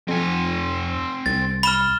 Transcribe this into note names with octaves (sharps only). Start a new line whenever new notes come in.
F2 C4 G#5
C2 A6
B5 F6 E7 G7